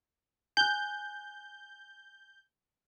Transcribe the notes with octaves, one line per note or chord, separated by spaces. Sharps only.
G#5 F#6 G6